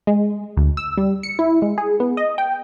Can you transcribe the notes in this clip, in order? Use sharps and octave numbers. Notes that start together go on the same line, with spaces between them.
G#3
D2
E6
G3
C#7
E4
G#3
G#4
B3
D#5
G5